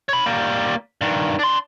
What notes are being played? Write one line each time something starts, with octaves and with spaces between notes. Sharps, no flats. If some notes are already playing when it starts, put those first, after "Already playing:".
C#5 B5
G3 A#3
G2 D#3
D4 C6